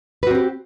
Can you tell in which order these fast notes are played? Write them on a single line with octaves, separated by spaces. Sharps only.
B4 F#4 C4 G4